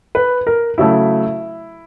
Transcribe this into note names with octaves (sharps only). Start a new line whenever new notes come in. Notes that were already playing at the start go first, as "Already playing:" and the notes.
B4
A#4
C#3 F#3 A3 E4